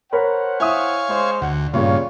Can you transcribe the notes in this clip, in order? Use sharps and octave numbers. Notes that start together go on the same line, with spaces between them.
A#4 C5 C#5 F#5 B5
E4 C#5 E5 F5 G#5 D#6
G#3 C5 C6
D2 F#5
G2 A#2 C#3 F3 F4 C#5